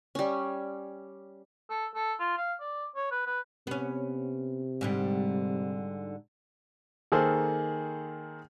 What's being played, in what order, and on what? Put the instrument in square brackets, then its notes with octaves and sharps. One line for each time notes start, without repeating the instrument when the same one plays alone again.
[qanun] G3 C#4
[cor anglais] A4
A4
F4
F5
D5
C#5
B4
B4
[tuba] C3 [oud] B3 C#4
[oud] G#2 D3 G3
[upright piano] D#3 A#3 G#4 A4 C5